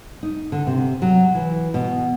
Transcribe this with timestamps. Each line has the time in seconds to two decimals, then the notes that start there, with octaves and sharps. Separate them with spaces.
0.23 D#4
0.52 D3
0.67 C3
1.02 F#3
1.35 E3
1.74 B2